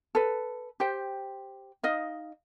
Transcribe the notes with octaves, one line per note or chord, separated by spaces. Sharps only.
A4 B4
G4 C5 G5
D#4 D#5 F5